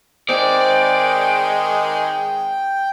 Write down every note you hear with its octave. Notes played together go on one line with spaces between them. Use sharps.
D#3 G#3 C4 D5 G5